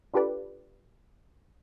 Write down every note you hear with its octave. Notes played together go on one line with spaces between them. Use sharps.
D4 F4 G4 A4 B4 D5